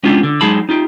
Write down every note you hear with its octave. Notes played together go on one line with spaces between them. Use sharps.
G#3 B3 C#4 D4 F4 G4
D3
F#3 G#3 D#4 G#4 A5 B5
D#4 F4 G4